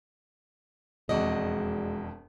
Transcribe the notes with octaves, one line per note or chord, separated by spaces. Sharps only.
E1 F2 G#3 F#4 D5 D#5